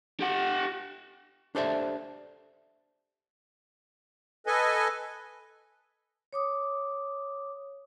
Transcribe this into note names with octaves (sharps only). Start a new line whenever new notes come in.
G4 F#5
D4 G4 A4 C5 D5 E5
A4 B4 D#5 G#5
C#5 D6 D#6